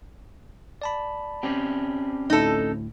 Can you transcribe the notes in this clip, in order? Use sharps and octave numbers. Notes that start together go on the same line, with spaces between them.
D5 A5 B5
C4 C#4 G4
D2 A2 D#4 A4